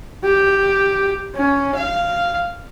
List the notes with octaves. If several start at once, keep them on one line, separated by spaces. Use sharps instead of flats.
G4
C#4
F5